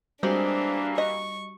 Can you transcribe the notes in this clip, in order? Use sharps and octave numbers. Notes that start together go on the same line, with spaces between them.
E3 G3 G#3 A#3 C4 D4 F#4 G4
D#5 C#6